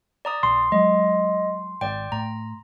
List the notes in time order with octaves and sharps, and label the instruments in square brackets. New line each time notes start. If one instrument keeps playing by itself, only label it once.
[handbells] D5 A#5 D#6
[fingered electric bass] A#1 [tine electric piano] C6
[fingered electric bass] F#3 G#3 [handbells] D#5
[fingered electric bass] G#1 [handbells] D5 G5
[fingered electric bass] A2 [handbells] A#5